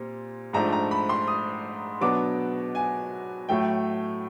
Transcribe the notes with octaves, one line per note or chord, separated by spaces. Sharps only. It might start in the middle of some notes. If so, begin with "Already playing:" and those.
Already playing: A#2 G3 C4
G#2 F3 A3 D4 A#5
A#5
B5
C6
D#6
B2 F#3 B3 D4 D6
G#5
A2 F#3 A3 G5